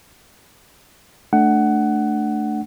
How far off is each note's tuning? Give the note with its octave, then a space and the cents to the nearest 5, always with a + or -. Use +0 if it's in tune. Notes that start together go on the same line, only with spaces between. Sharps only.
A3 -5 D4 +5 F#5 +15